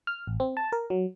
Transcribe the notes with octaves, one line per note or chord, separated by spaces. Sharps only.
F6
A1
C4
A5
A#4
F#3